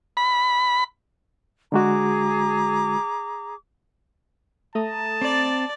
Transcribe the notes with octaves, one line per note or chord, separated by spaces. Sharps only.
B5
D3 G#3 F#4 G#4 A#5 D6
A3 A5 A#5 D#6
C4 D5